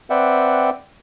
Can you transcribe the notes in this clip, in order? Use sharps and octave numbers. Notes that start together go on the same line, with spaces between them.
C4 B4 D5 E5 F#5 G5